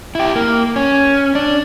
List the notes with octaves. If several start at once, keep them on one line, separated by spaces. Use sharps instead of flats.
E4 G4
A#3
C#4
D4